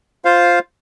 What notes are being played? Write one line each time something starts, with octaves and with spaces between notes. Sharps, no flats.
F4 C5 F5